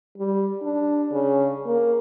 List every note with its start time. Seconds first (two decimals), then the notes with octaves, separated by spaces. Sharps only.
0.18 G3
0.62 D4
1.12 C#3
1.66 A#3